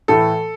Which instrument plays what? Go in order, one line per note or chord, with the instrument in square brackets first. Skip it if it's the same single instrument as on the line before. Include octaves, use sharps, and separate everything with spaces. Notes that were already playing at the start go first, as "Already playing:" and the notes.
[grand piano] A2 E3 A3 A4